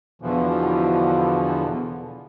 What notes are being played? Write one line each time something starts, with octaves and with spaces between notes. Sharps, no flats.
E2 B2 D3 E3 F3